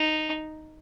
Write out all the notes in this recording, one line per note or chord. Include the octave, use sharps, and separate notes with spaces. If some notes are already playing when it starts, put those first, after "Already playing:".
Already playing: D#4